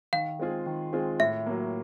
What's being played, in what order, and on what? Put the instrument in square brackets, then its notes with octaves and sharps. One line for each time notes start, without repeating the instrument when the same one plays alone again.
[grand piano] D#3 [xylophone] F5
[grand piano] G#3 C4 F4 G#4
D#3
G#3 C4 F4 G#4
[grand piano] A2 [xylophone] E5
[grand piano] F#3 A#3